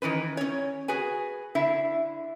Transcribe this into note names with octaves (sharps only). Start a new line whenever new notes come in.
D#3 E3 C#4 B4
C#4 C#5
F#4 G#4 B4 G#5
D3 E4 E5